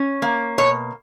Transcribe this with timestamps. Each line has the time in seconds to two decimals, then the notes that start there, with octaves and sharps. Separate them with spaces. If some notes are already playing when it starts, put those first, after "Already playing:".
Already playing: C#4
0.22 A#3
0.58 B2 C#5